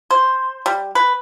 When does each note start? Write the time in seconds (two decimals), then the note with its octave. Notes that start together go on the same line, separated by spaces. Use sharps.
0.11 C5
0.66 G3
0.95 B4